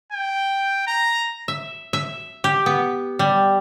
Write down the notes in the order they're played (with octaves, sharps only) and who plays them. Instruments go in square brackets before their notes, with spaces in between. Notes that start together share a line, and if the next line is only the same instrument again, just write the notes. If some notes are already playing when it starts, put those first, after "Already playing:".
[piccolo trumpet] G5
A#5
[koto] E5
E5
G4
B3
G3